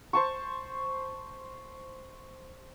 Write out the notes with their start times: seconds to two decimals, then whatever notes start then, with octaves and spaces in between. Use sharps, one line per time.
0.13 C5 A5 C#6